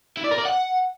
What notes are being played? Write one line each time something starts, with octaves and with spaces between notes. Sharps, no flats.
E4
D5
A#4
D5
F#5